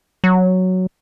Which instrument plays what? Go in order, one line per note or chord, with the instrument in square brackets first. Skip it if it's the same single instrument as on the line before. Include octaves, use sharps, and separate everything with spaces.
[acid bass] F#3